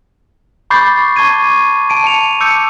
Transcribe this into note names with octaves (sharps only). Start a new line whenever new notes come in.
B5 C#6 D6 G6 A6 C7
A5 C#6 D6 G#6 D#7
A5 D7 D#7
A5 C#7 F7
D6 E6 G6 C#7